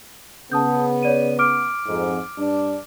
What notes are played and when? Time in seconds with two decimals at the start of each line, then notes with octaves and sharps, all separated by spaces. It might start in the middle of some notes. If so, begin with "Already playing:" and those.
0.52 C#3 B3 A5 D#6 G6
1.03 C#5 D5 D#7
1.39 D6 F6 D7
1.87 F2 G#2
2.38 G2 D4